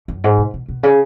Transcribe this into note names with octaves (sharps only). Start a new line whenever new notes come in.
F#2
G#2
B2
B2
B2
C#3